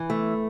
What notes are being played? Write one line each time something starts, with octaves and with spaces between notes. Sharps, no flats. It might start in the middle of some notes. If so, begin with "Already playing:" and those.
Already playing: E3
A3